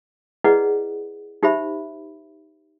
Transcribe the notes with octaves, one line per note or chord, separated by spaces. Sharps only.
E4 G#4 B4 D5 D#5 F#5
D#4 G4 C5 E5 B5